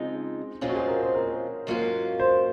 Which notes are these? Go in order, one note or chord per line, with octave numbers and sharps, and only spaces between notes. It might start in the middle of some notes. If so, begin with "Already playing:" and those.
Already playing: C#3 F3 G#3 C4 D#4
A#2 F3 G#3 C4 C#4 F4
F#4
G#4
A#4
C5
A#4
G#2 F#3 A#3 C#4 F4
C5